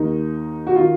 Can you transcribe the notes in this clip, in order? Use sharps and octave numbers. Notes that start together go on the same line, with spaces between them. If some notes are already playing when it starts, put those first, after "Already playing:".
Already playing: D#2 D#3 D#4
F#4
D#3 F4